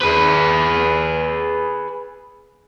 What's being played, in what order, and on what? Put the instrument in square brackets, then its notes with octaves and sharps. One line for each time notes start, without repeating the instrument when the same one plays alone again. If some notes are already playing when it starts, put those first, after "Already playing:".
[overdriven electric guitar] G#4 B4